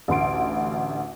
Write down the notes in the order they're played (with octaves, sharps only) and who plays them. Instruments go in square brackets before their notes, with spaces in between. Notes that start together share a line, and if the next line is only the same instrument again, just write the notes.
[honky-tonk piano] A1 D2 C6 D7